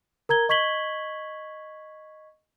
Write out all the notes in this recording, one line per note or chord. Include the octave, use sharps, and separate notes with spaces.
A#4 A#5 G#6 G7
D#5 C#6 G#6 B6 F#7 G7